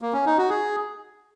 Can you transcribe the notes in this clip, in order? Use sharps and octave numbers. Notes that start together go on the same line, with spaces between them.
A#3
C#4
D#4
F#4
G#4